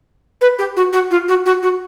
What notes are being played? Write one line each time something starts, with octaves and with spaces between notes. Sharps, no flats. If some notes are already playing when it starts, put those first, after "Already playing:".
B4
G4
F#4
F#4
F4
F#4
F#4
F#4